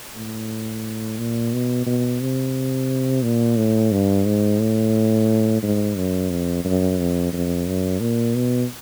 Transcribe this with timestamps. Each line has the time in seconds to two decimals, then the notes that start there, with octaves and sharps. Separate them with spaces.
0.16 A2
1.18 A#2
1.53 B2
1.86 B2
2.21 C3
3.23 A#2
3.57 A2
3.92 G2
4.26 G#2
4.59 A2
5.62 G#2
5.96 F#2
6.30 F2
6.64 F#2
6.98 F2
7.32 F2
7.67 F#2
8.00 A#2
8.35 B2